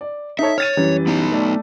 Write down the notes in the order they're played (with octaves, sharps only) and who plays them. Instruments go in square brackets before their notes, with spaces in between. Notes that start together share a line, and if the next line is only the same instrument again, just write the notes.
[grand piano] D5
[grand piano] D#4 A4 C#5 [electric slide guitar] E5
[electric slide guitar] C#5 [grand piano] F6 A6 D#7
[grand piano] F#2 E3 G3
[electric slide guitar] B3 D#4
[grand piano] A3 D5